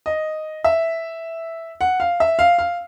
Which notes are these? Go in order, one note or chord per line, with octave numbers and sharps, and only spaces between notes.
D#5
E5
F#5
F5
E5
F5
F5